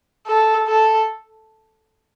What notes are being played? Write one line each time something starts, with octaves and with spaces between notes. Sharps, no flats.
A4
A4